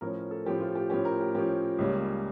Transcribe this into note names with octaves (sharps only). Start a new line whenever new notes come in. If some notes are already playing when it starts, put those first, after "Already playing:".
A2 F3 C#4 A#4
A#4
A4
A2 F3 C#4 G4
F4
G4
A2 F3 C#4 G4
A#4
G4
A2 F3 C#4 G4
C#2 C#3 G3 A#3 C#4